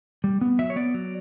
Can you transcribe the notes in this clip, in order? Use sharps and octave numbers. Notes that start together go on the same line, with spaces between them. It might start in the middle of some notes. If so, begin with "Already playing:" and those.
G3
B3
F#3 E5
C#5
B3 D5
F#3